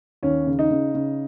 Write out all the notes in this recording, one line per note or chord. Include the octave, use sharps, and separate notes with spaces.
D#2 C#4
C#3
D#4
C#3
C#3